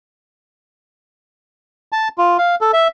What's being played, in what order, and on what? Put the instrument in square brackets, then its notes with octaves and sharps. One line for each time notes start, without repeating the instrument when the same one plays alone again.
[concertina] A5
F4
F5
A4
E5